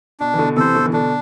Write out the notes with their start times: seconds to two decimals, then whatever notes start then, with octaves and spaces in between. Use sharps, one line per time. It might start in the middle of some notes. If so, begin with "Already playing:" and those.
0.20 B2 D4
0.34 E3
0.38 B2 D3
0.56 C3 E3 A4 C5
0.75 B2 D3
0.86 E3
0.93 B2 D3 D4